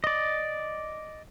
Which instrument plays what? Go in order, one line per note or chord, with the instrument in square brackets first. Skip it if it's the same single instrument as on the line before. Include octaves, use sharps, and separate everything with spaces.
[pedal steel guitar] D5 D#5